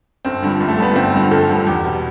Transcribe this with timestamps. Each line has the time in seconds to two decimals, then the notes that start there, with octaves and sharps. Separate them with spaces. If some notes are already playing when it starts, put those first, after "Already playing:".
0.25 G1 C4
0.42 G2 D3 F3
0.60 G1
0.69 A3
0.78 G2 D3 F3 B3
0.96 G1 C4
1.14 G2 D3 F3
1.31 G1 A4
1.49 G2 D3 F3
1.67 E2 G4
1.84 B2 G3